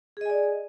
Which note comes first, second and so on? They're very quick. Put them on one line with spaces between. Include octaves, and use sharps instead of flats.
G#4 D#5 G#5 D5